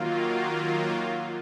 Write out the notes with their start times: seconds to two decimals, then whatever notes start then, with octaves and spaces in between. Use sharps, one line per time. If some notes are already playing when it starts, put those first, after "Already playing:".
Already playing: D#3 F#3 A#3 F4